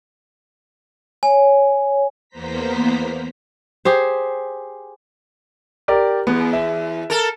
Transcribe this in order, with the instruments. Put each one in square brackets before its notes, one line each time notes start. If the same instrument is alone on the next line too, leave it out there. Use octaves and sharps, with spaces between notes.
[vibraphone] C#5 [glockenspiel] G#5
[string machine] E2 A#3 B3 C5 A#5 B6
[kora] G4 G#4 C5
[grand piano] G4 A#4 D5
[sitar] E2 [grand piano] B3
[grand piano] E5
[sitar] A4 A#4